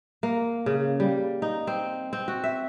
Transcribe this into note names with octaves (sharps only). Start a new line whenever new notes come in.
A#3
C#3
G3
D#4
C4
C4
F#4
E5